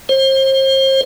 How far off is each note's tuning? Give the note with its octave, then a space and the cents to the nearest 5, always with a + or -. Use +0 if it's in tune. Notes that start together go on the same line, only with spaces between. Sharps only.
C5 +35